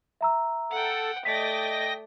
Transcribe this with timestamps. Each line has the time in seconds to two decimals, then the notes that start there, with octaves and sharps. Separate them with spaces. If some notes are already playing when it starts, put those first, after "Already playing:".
0.21 E5 A#5 E6
0.71 A4 F#5 G5
1.25 A3 D5 D#5 G5 A#6 B6